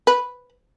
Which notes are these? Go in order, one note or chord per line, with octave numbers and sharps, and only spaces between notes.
B4